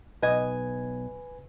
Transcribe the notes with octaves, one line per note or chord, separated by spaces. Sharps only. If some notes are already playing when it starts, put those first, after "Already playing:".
B1 B4 D#5 G#5 G#6